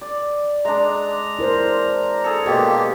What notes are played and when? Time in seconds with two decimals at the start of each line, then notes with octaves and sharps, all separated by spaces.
0.01 D5
0.65 G#3 D4 A#5
1.39 E4 A#4 C5
2.24 G#4 A4
2.46 B2 G#3 A#3 G4 A4